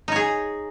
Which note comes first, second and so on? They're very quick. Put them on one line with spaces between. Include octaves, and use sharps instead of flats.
D#4 C#5 G#4